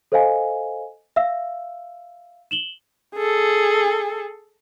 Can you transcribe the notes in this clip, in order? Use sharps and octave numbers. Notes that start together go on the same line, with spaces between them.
A4 C5 D#5 F5 G#5
E5 F5 E6
E7 F#7 G7
G#4 A4